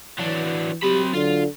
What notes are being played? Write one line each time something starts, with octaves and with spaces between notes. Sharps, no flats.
E3 F#3 D4
F#3 C4 G4 B5
D3 F4